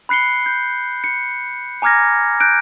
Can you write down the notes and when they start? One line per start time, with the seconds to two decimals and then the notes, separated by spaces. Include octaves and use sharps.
0.09 B5 F#6 C7 C#7 G7
0.46 G6
1.04 C#7
1.82 G#5 A#5 D6 F6 G#6 A#6
2.40 F#6 G6 D7